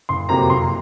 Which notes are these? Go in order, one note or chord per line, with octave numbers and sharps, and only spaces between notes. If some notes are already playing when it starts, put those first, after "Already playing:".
F#1 C6
F2 C3 F#3 A#3 A#5
F#1 C6